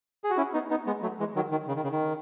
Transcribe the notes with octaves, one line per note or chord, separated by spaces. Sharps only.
G#4
F#4
C#4 E4
B3 D#4
B3 D#4
G#3 B3
F#3 A3
E3 G#3
D#3 F#3
D#3
C#3
D#3
C#3
D#3